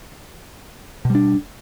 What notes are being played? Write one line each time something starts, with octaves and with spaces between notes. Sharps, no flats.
B2 G3 D4